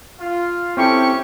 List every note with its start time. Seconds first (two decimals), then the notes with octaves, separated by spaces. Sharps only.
0.20 F4
0.77 C4 C#4 E4 G4 A4 G5 C#6